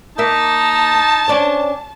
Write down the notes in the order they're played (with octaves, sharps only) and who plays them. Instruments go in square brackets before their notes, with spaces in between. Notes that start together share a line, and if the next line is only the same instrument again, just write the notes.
[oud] A#3 A#4 E5 [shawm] D#4 [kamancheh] A5
[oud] C#4 D4 C5